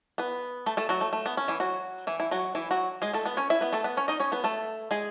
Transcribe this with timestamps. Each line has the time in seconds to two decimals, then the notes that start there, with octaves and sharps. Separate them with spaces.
0.18 B3 B4
0.66 A3 A4
0.77 A3 A4
0.89 F#3 F#4
1.01 A3
1.13 A3
1.26 B3
1.37 C#4
1.48 E3 E4
1.60 F#3 F#4
2.07 E3 E4
2.20 E4
2.31 F#3 F#4
2.55 E3 E4
2.71 F#3 F#4
3.02 G#3 G#4
3.13 A3 A4
3.26 B3 B4
3.37 C#4 C#5
3.50 E4 E5
3.61 B3 B4
3.73 A3 A4
3.84 B3 B4
3.97 C#4 C#5
4.08 D#4 D#5
4.20 C#4 C#5
4.32 B3 B4
4.44 A3 A4
4.91 G#3 G#4